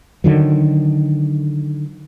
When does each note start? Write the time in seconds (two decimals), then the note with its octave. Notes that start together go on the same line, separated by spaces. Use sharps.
0.24 D3 D#3 F#3